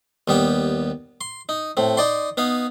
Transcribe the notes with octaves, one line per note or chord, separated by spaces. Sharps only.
D#2 G3 B3 G5
C6
D#4
A2 C4
D#4 D5 C6
B3 D#4 F5